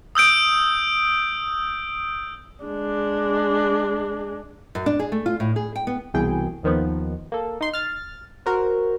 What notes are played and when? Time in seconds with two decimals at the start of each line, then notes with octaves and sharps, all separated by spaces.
0.15 D#6 E6 G6 D7
2.64 G#3 D4
4.75 F#2
4.86 D4
4.99 G#4
5.12 A3
5.26 F4
5.40 A2
5.56 G#4
5.76 G5
5.87 B3
6.14 C2 B2 E3 G#4 G5
6.63 D#2 D#3 F3 B3
7.32 A#3 A4
7.61 D#4 C6
7.73 F6 A6
8.46 F#4 A#4 C5